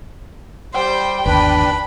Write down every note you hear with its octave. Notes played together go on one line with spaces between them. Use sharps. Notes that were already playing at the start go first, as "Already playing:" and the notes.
G3 C5 G5
G1 D#2 D4 B4 B5